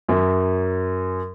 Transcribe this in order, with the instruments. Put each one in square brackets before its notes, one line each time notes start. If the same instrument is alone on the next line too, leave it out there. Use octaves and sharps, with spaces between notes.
[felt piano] F#2